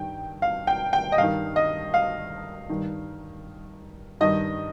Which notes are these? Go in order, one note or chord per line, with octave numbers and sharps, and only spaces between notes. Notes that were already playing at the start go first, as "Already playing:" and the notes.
Already playing: G2 D#3 G5
F5
G5
G5
D#5
G2 D#3 F5
D#5
F5
G2 D#3
G2 D#3 D#5